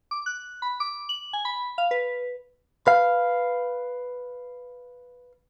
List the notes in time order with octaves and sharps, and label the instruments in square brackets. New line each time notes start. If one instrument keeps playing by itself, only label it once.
[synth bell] D6
F#6
B5
D6
F#7
G#5
B5
F5
B4
[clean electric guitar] B4 F5